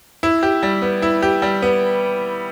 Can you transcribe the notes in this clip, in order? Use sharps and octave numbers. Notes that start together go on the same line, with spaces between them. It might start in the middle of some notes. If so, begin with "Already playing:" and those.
E4
G4
G3
B3
E4
G4
G3
B3